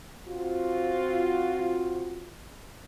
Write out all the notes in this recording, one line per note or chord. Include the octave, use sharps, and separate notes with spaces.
C4 F4 F#4